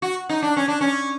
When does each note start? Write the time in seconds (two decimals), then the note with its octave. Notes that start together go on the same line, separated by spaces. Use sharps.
0.02 F#4
0.29 D#4
0.42 D4
0.57 C#4
0.68 D4
0.81 C#4